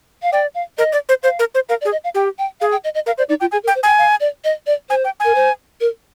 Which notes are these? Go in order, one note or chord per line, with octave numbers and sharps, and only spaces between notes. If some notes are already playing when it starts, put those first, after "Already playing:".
F5
D5 G5
F5
A#4 D#5
D5
C5
C5 F5
A#4
C5
A#4 F5
D5
G#4
D#5
F5
G4 G5
G5
G#4 F5
G5
D#5
D#5
A#4 F5
C5 D5
D#4 D5
F4 G5
G#4 G#5
A#4
G5
C5
G5 G#5
F5
D5
D#5
D5
C5 G#5
G5
A#4 G#5
C5
A#4